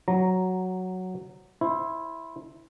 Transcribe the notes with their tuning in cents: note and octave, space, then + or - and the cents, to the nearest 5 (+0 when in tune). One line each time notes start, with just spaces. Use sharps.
F#3 +0 A#5 +0
E4 +0 C5 +15